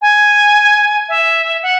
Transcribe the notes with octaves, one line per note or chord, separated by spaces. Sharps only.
G#5
E5
F#5